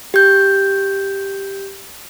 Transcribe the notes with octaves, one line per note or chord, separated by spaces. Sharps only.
G4 G6